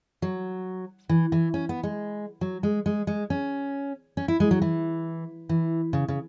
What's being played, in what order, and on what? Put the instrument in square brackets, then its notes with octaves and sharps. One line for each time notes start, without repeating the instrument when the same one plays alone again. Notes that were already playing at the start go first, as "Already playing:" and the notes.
[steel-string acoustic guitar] F#3
E3
E3
C#4
B3
G#3
F#3
G#3
G#3
G#3
C#4
C#4
E4
G#3
F#3
E3
E3
C#3
C#3